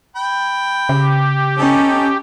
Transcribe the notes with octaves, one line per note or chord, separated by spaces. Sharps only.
G5 B5
C#3 G4
C#4 D#4 A4